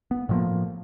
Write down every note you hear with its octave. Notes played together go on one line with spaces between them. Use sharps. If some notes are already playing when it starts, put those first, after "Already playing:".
B3
A2 F3 A#3